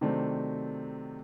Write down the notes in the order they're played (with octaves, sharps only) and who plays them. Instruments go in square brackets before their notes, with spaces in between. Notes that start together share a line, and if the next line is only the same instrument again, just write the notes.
[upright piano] C3 D#3 F#3 A3 C4 D4